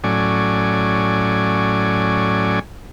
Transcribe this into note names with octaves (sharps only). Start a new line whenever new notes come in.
A2 F#3 C#4 D5 G#5